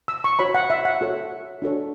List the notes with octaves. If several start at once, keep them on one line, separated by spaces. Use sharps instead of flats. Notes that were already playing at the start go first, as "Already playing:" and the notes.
E6
C#6
F#4 C#5 B5
F#5
E5
F#5
F#4 A4 C#5
D4 F#4 A4 C#5